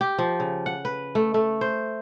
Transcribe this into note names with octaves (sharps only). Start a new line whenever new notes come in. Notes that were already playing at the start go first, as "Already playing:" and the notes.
G4
F3
C#3
F#5
B4
A3
A3
C5